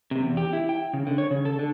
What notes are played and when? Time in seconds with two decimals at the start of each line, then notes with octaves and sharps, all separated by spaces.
0.11 C3
0.23 E2
0.37 G4
0.53 E4
0.69 G5
0.93 C#3
1.07 D3
1.18 C#5
1.31 C#3
1.45 A4
1.59 D3